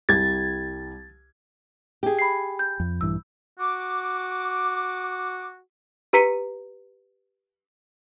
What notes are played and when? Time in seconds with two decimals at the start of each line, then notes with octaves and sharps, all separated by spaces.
0.09 C2 G3 G#6 A6
2.03 G4 G#4
2.19 B5 C7
2.59 G6
2.80 F2
3.01 A#1 G2 E3 E6
3.59 F#4 D6
6.13 G4 B4 A#5 B6 C#7 D#7